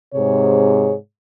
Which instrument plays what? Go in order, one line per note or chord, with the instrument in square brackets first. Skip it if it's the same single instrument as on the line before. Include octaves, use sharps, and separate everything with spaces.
[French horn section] G#2 C3 G#4 C#5